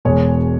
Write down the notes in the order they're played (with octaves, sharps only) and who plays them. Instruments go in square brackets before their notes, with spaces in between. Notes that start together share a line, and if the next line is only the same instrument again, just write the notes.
[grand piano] E1 E2 B2 G#3 C#5